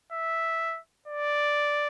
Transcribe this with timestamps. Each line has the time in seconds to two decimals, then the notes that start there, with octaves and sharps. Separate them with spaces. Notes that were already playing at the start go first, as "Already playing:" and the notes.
0.12 E5
1.08 D5